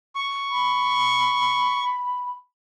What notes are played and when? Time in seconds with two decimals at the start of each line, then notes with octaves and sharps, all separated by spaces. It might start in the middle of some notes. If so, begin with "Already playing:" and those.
0.16 C#6
0.51 B5